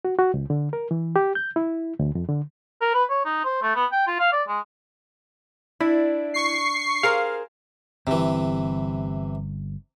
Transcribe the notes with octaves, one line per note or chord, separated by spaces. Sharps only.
F#4
F#4
C#2
D3
A#4
E3
G4
G6
E4
D2
F2
D3
A#4
B4
C#5
D#4
C5
A3
B3
G5
F4
F5
D5
G#3
D4 E4
C#6 C7
G#4 A#4 C5 F5
G1 C3 E3 C4